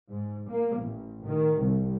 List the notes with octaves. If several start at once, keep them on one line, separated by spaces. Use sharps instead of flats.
G#2
A#3
A1
D#3
C2